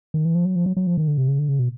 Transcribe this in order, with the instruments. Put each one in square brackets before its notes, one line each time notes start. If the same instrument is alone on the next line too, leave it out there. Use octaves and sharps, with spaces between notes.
[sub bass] D#3
E3
F3
F#3
F3
F#3
F#3
F3
D#3
D3
C3
C#3
D3
C#3
B2